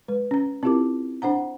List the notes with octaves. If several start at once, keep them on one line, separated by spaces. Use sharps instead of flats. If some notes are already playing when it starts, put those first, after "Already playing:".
G#3 B4
C#4 A#5
C4 E4 F4 G4 A#4 D6
D4 C5 F#5 A#5